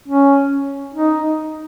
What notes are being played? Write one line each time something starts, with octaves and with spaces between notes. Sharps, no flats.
C#4
D#4